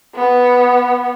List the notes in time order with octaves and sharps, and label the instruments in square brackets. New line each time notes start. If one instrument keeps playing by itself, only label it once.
[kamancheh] B3